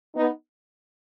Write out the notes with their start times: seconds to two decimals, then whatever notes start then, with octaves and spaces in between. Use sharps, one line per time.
0.15 B3 D#4